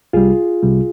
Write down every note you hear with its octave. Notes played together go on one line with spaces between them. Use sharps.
C2 C3 G3 F4 G#4
C2 C3 G3